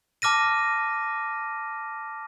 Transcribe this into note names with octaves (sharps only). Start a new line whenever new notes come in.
A5 D6 F6 A#6 D#7